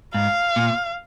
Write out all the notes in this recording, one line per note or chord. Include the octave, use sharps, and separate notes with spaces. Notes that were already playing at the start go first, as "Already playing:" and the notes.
G#2 F5
A#2